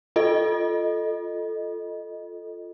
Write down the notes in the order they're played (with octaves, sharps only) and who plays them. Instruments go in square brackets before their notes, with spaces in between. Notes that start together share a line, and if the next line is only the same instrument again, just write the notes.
[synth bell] F4 A4 D#5